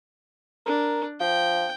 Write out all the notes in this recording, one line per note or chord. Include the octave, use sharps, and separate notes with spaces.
D4 A#4
F3 G5